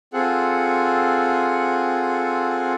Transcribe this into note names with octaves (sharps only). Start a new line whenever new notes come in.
C4 F4 G#4 A4 F#5